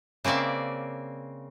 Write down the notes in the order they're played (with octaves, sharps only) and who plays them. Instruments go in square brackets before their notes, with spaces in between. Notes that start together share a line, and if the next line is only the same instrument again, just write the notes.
[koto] C#3 A#3 C4 D5 E5